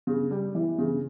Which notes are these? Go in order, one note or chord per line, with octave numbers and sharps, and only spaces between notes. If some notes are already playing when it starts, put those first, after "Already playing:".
C#3
G3
E3
C#3